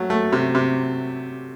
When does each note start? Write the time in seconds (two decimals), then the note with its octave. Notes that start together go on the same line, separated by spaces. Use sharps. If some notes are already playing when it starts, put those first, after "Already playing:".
Already playing: F#3 A3
0.10 A3
0.32 C3
0.55 C3